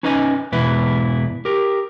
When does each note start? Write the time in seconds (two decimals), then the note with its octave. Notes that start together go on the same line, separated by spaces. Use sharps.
0.03 C#4 D#4 B4 D#5 G#5
0.52 E2 G#2 B2 E4 B4
1.45 G4 A#4